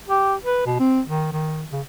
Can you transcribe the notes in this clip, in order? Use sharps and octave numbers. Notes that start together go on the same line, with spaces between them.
G4
B4
B2
C4
D#3
D#3
C#3